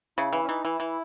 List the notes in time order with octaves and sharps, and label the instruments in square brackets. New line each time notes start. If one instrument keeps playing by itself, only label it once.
[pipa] C#3 [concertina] E4
[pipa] E3 [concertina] E4
[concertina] C#4
[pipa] E3 [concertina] D#4
[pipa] E3 [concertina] E4
[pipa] E3